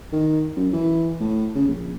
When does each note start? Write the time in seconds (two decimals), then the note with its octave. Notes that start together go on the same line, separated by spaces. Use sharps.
0.13 D#3
0.57 F#2
0.73 E3
1.21 A2
1.55 C#3
1.68 A#1